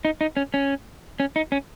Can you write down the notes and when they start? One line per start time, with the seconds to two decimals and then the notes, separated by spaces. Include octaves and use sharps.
0.05 D#4
0.21 D#4
0.37 C#4
0.54 C#4
1.20 C#4
1.36 D#4
1.52 C#4